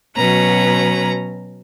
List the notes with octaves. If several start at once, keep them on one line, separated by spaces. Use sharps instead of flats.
B2 F#3 C#4 B4 A#5